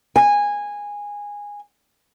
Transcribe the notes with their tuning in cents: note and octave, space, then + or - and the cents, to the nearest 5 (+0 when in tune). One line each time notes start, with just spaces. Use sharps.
G#5 -15